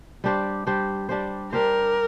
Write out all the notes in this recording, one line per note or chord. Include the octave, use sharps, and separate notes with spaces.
G3 D4 G4 C5
G3 D4 G4 C5
G3 D4 G4 C5
G3 D4 G4 A#4 C5